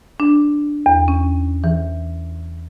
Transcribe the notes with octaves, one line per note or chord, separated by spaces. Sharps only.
D4
E2
C#4
E3